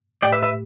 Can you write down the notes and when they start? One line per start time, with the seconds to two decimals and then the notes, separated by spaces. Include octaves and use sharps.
0.22 A2 A3 G4 D5 G5
0.32 B4 E5
0.42 B4 E5